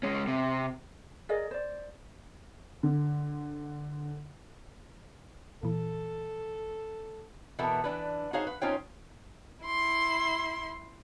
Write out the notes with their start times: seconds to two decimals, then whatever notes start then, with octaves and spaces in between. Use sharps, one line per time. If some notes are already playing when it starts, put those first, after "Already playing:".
0.03 G#3 C#4
0.27 C3
1.29 G#4 A#4 D5 D#5
1.51 C5 D5
2.83 D3
5.63 A#2 E3 A4
7.59 B2 E3 B3 A4 A#4 E5
7.84 E3 D4 B4
8.33 D#4 F#4 G#4 C5 C#5 F5
8.47 B4
8.62 C#4 D#4 F4 C5 C#5 G5
9.65 E4 C6